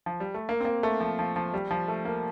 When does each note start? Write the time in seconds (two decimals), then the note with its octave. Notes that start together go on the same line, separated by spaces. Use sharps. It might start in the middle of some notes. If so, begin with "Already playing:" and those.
0.06 F3
0.20 G3
0.34 A3
0.49 A#3
0.60 C4
0.65 A#3
0.83 A3
1.00 F3
1.19 F3
1.36 F3
1.54 G3
1.71 F3
1.88 A3
2.05 A#3